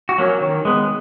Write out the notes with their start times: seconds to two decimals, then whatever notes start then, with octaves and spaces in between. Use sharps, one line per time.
0.09 F#4
0.18 F#3 A#3 C#4
0.41 D#3
0.65 G#3 B3